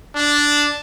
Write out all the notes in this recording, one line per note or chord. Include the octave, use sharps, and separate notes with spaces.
D4